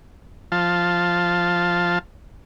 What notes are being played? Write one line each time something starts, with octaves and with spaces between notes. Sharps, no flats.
F3 F5 A5